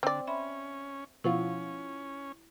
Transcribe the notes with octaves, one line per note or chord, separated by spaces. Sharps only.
D3 C4 D5
C#4 E5 B5 C6
B2 F3 C#4 E4 F4 F#5 C#6